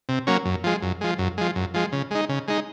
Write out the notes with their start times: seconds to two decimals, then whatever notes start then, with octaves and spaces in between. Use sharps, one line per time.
0.09 C3
0.27 F#3 A#3 C#4
0.45 F#2
0.64 F3 G#3
0.82 F#2
1.01 F3 G#3
1.19 F#2
1.38 F3 G#3
1.55 F#2
1.74 F3 G#3
1.92 C#3
2.11 G#3 D#4
2.29 C#3
2.48 G#3 D#4